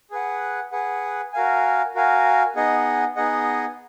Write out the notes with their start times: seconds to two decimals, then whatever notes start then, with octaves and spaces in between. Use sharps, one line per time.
0.11 G#4 B4 F#5
0.72 G#4 B4 F#5
1.33 F#4 A#4 F5 G#5
1.95 F#4 A#4 F5 G#5
2.55 B3 D#4 G#4 D#5 F#5
3.16 B3 D#4 G#4 D#5 F#5